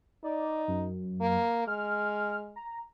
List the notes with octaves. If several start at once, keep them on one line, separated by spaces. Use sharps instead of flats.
D#4 D5
F#2
A#3
G#3 F6
A#5